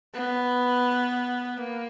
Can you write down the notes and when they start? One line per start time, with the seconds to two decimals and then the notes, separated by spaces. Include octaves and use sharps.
0.14 B3
1.57 A#3